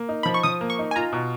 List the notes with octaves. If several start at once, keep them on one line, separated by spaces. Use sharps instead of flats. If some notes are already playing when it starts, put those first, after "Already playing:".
Already playing: A#3
D#4
F3 B5
C#6
F3 D#6
A#3
C#6
D#4
G#5
F4 A#5
B2